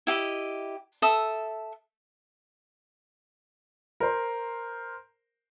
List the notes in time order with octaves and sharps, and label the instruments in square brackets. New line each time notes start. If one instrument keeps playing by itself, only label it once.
[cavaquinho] E4 G4 D#5
A4 E5 D#6
[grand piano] A#4 C5